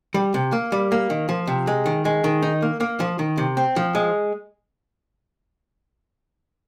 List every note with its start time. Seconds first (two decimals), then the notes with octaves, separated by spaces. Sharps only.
0.14 G3
0.34 C3
0.52 A#3
0.72 G3
0.92 A#3
1.10 D#3
1.29 F3
1.47 C3
1.67 G#3
1.86 D#3
2.05 G#3
2.24 D#3
2.42 D#4
2.62 A#3
2.81 A#3
3.00 F3
3.19 D#3
3.38 C3
3.57 C4
3.76 F3
3.95 G#3